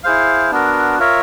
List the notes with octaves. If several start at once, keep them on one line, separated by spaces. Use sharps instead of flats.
E4 G#4 C5 F5
B3 D4 F#4 A#4
F4 A#4 C#5 E5